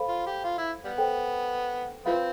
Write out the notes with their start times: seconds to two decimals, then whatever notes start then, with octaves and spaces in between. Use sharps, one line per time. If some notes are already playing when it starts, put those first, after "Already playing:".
Already playing: A4 C5 F5 B5
0.09 F4
0.27 G4
0.44 F4
0.58 E4
0.85 G3 B3
0.98 A4 C5 G5
2.06 F3 A3 C4 F4 B4 F5 B5